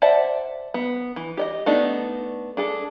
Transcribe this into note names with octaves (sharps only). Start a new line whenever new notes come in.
C5 D5 E5 F#5 A5
B3
E3
G4 D5 D#5
A3 B3 D4 D#4
D4 G#4 A4